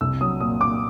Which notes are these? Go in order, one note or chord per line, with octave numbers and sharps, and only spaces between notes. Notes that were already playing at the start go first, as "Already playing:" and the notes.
C2 E6
F#3 D#6
A#2 D#6
A#2 D6